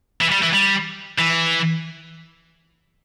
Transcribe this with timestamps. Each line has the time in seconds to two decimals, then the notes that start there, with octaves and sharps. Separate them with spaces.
0.21 E3
0.32 G3
0.43 E3
0.53 G3
1.19 E3